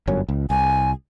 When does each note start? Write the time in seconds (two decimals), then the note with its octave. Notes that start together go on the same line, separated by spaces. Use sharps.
0.08 G1 F#2 C#4
0.29 C#2
0.50 C2 G#5